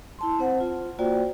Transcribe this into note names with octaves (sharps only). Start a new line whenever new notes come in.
E4 A5 C6
C4 C5 F#5
F4
A#3 F4 F#4 C5 D5 G5